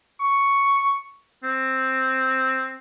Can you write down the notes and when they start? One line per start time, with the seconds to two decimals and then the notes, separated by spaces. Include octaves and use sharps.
0.20 C#6
1.44 C4